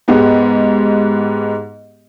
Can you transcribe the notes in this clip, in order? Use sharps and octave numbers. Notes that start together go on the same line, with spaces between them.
G#2 G#3 B3 G4